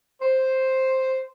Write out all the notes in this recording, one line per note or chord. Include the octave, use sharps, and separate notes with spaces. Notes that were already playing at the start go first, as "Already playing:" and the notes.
C5